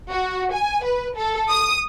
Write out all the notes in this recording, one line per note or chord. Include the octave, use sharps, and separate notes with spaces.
F#4
G#5
B4
A4
D#6